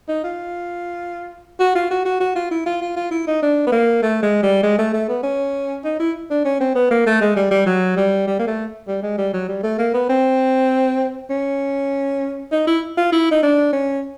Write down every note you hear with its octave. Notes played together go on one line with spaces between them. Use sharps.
D#4
F4
F#4
F4
F#4
F#4
F#4
F4
E4
F4
F4
F4
E4
D#4
D4
B3
A#3
A3
G#3
G3
G#3
A3
A3
B3
C#4
D#4
E4
D4
C#4
C4
B3
A#3
A3
G#3
G3
G3
F#3
G3
G3
A#3
A3
G3
G#3
G3
F#3
G3
A3
A#3
B3
C4
C#4
D#4
E4
F4
E4
D#4
D4
C#4